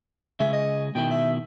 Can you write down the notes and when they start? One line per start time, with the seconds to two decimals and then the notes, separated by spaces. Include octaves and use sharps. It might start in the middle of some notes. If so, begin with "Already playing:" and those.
0.40 C#3 G#3 G#4 E5
0.53 D#5
0.95 B2 D#3 E4 G5
1.11 E5